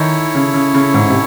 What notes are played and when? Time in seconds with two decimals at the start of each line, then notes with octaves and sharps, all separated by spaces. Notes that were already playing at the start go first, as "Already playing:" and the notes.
Already playing: D#3 E4 A4 C#5
0.35 C#3
0.54 C#3
0.74 C#3
0.94 G#2
1.10 C3